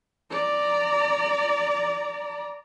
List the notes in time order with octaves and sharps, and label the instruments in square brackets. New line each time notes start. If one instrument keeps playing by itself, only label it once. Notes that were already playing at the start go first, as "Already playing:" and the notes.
[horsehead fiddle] D5 A#5